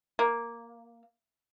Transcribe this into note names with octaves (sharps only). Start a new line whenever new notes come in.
A#3